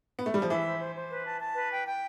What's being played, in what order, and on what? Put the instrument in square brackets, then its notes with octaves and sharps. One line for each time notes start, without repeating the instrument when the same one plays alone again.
[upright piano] B3
A3
G3
F3
[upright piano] E3 [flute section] E5
[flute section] C5
C5
C5
B4
A5
A5
B4
G5
G5